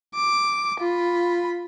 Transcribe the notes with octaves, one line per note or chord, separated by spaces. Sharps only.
D6
F4 B5